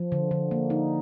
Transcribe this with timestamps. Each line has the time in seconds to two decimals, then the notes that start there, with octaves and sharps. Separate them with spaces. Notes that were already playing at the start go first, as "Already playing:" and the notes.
Already playing: F3
0.12 D3
0.31 D3
0.51 A#3
0.70 D#4